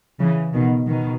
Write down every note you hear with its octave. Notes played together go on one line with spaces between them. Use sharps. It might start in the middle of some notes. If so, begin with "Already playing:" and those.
C#3 E3
B2 D#3
B2 D#3